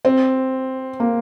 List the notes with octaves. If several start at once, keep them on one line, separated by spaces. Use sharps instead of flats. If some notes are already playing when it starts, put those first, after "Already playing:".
C4
A#3